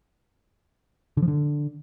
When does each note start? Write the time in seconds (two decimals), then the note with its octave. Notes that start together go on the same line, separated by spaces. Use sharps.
1.17 D3
1.22 F3
1.28 D3